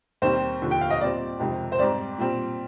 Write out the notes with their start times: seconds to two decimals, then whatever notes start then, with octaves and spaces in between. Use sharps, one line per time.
0.22 D#2 D#3 G3 C4 C5
0.61 D#2 D3 F3
0.71 G5
0.81 F5
0.90 D#5
1.01 A#2 G3 C4 D5
1.39 F2 C3 D#3 G#3
1.72 C5
1.79 G#2 G3 C4 D5
2.18 A#2 G3 C4